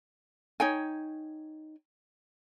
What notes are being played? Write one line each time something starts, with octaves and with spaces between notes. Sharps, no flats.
D#4 C#5 G5 G#5